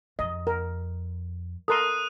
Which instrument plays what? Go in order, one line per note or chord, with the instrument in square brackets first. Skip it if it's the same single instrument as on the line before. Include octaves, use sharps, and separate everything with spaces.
[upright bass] F2 [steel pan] D#5
[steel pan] A#4
[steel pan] A4 A#4 C6 [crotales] D#6 F#6 D#7